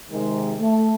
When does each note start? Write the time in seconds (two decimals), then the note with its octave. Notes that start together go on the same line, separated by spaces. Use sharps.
0.11 C3 D#3 G#3
0.59 A3